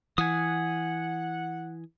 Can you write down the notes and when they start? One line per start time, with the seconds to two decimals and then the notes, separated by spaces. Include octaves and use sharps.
0.18 E3 F#5 G#5 D#6